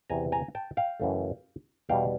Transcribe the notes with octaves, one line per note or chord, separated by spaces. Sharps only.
E2 C3 E3 G#5 A#5
G#5 A#5
G5 A5
F5 G5
F#2 C#3 E3 A3
E2 B2 G3 F5 G5